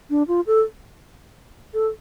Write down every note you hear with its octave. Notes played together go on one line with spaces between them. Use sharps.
D4
F4
A4
A4